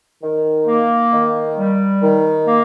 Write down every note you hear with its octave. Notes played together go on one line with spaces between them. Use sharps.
D#3
A#3
D#3
G3
D#3
A#3